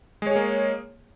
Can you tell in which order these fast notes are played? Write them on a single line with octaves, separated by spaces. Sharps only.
G#3 C#5 G#4 A#3